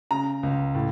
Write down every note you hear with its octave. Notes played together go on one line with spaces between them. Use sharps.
C#3 A#5
C#2
A2